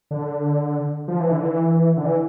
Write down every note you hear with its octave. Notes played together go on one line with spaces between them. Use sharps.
D3
F3
E3
D3
E3
D3
E3